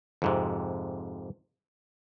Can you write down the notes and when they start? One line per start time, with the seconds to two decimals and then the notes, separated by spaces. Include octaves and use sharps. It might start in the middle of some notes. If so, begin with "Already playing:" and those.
0.22 F2 G#2 C3